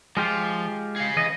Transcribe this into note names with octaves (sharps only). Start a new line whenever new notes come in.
F3 G#3 F4 G4
G#4 F5
E3 D#5